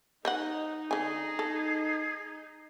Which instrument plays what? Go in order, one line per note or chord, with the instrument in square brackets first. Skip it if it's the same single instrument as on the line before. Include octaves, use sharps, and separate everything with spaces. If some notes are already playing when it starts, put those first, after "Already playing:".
[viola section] D#4 [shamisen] C5 D#5 F#5
[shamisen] D3 G#5 [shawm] G#4
[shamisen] A4